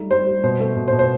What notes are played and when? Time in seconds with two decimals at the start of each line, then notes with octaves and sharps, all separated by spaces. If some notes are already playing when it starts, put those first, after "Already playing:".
Already playing: G3 A3 D#4
0.11 G3 C5
0.27 G3
0.43 B2 C5
0.60 A3
0.76 B2
0.88 C5
0.92 B2
0.99 C5